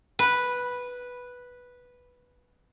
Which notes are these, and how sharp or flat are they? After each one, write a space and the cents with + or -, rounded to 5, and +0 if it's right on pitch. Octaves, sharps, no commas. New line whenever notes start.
B4 -5